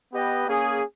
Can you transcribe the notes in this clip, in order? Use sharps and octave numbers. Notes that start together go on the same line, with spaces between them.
B3 G4 B4 D#5 G5
A#3 C#4 G#4